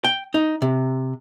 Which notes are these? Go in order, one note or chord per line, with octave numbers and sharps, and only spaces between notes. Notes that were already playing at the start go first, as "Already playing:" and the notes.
G5
D#4
C3